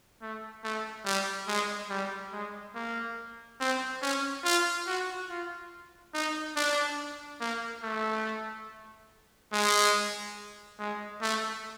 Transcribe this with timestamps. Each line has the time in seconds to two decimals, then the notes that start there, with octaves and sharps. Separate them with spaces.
0.22 A3
0.64 A3
1.05 G3
1.48 G#3
1.90 G3
2.33 G#3
2.75 A#3
3.60 C4
4.02 C#4
4.44 F4
4.87 F#4
5.29 F4
6.14 D#4
6.56 D4
7.41 A#3
7.83 A3
9.53 G#3
10.79 G#3
11.22 A3